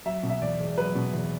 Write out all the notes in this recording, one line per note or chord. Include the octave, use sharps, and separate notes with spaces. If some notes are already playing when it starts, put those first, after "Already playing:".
F#3 E5
B2
E5
E2 D5
E1
F#3 B4
B2
E2